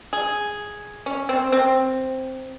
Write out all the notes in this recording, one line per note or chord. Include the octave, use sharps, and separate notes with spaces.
G#4
C#4
C4
C4